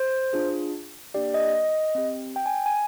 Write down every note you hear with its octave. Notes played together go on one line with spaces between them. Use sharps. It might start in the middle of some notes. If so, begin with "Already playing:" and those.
Already playing: C5
D4 F4 G#4
A#3 D4 G4 D5
D#5
C4 G4
G5
G#5
G#5